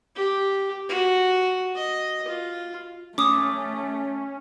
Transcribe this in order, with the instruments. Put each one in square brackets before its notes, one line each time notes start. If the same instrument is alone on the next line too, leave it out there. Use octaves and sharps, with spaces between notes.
[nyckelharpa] G4
F#4
D#5
F4
[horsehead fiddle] A3 [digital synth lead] C#4 [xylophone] D6 D#6